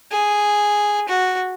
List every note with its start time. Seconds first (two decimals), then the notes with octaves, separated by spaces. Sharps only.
0.11 G#4
1.08 F#4